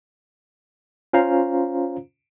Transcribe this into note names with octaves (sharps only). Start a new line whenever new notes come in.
C#4 F4 C5 F5 A#5